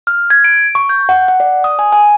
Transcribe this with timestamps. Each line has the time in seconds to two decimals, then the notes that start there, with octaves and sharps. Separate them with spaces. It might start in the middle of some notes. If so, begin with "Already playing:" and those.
0.07 F6
0.30 G#6
0.44 D7
0.75 C#6
0.89 G6
1.09 F#5
1.28 F#5
1.40 D5
1.64 D#6
1.79 G#5
1.92 G#5